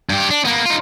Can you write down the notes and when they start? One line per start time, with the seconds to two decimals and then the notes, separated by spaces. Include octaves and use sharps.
0.10 G2 G4
0.31 D4
0.45 A#3 B3
0.66 D#4 F4